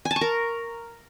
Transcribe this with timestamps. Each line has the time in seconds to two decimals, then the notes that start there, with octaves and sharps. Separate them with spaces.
0.05 G#5
0.11 A5
0.16 C#6
0.21 A#4